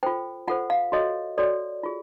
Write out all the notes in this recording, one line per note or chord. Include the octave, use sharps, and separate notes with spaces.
F4 A4 C5 G5
F4 A4 C5 F#5
F5
F#4 A4 C#5 D#5
F#4 A4 C#5 D5
F4 G#4